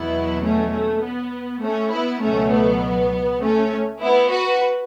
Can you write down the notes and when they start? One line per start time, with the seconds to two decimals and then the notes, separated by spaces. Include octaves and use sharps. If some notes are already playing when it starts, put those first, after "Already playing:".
Already playing: E2 B2 F#3 B3 E4
0.43 A3 C#4
0.74 A3
1.03 B3
1.63 A3 C#4
1.92 B3 E4
2.22 C#2 B2 F#3 A3 C#4
2.52 B3
3.41 A3 C#4
4.01 B3 E4
4.31 F#4 B4